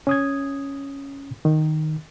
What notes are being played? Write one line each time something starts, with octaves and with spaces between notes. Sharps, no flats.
C#4 D#6 G#6
D#3